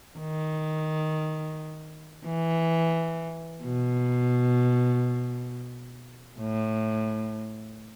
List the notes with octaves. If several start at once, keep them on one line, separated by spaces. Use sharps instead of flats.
D#3
E3
B2
A2